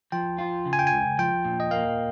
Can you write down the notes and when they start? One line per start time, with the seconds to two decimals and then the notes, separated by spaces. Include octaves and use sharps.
0.12 F3 G5
0.38 F4
0.66 C#3
0.73 G#5
0.79 G5
0.87 G#5
0.92 C#2
1.19 F3 G5
1.45 A#2
1.60 D#5
1.71 A#3 F5